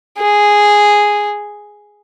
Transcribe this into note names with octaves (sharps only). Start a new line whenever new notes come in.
G#4